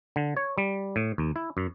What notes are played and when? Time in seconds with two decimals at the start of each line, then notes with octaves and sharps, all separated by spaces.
0.16 D3
0.37 C#5
0.58 G3
0.96 A2
1.18 D#2
1.36 E4
1.57 F#2